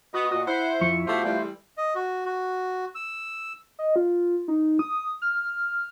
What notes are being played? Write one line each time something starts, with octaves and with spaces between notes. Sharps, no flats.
B3 F#4 D#5
A#2 F#4 D#5
E4 C5 F#5
F2 F3 C#6
B2 A3 F4 G4 C5
E3 G3 A3
D#5
F#4
F#4
E6
D#5
F4
D#4
D#6
F6